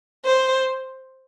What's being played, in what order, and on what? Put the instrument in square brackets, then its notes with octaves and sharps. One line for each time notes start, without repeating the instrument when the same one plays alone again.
[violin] C5